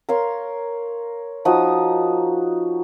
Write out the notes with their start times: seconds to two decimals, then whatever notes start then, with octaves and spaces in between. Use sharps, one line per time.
0.09 A#4 C#5 F5 C6
1.45 F3 D#4 F#4 D#6